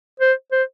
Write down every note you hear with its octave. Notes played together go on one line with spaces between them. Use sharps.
C5
C5